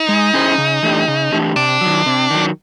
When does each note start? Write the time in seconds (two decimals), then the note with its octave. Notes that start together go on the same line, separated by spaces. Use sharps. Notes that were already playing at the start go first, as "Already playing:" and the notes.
Already playing: D#4
0.09 G#3
0.34 C#4 E4 G#4 C5
0.58 C#3
0.83 E3 A3 D4 G4
1.08 C#3
1.32 E3 A3 D4 G4
1.56 C3 D4
1.81 D#3 F#3
2.06 C3
2.31 D#3 F#3